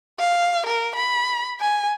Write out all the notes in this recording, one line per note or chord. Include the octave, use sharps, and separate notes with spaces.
F5
A#4
B5
G#5